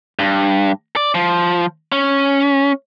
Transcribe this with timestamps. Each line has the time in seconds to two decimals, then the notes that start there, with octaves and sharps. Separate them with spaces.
0.19 G2
0.96 D5
1.15 F3
1.92 C#4